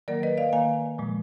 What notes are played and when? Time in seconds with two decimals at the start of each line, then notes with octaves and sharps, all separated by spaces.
0.08 D#3 F#3 A#3 A#4 D5
0.23 B4 D#5
0.38 D5 F5
0.53 D#3 A#3 F5 G#5
0.98 A#2 F3 G#3